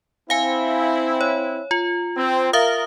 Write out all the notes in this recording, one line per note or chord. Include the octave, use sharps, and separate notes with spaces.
C4 E4 F5 G#5
C#5
F4
C4
A#4 E5 F5 D#6